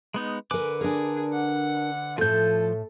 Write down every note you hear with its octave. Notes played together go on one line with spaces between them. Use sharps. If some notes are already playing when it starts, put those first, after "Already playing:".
G#3 B3 D#4
D3 A#4 B4 G#5 D6
D4 G#4 A#4
F#5
A2 F3 A3 A4 G6